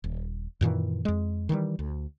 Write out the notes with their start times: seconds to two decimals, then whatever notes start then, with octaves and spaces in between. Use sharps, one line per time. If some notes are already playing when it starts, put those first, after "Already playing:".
0.04 D#1
0.61 F#2 A#2 D#3 E3
1.05 F2 G#3
1.49 D#3 E3 F#3 G3
1.79 D2